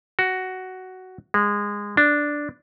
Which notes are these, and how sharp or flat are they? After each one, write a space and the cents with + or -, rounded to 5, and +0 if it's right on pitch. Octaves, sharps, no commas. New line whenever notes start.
F#4 +10
G#3 -20
D4 +0